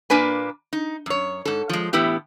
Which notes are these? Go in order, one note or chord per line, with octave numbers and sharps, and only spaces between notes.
A#2 A#3 D4 B4 G#5
D#4
F#2 C#5
G#2 A4
F3 G#3
A2 E3 B3 E4 G4